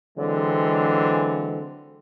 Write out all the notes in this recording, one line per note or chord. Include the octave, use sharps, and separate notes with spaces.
D3 E3 F#3 G#3 C4